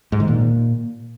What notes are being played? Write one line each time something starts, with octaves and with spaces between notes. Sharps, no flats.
G#2
D#3
A#2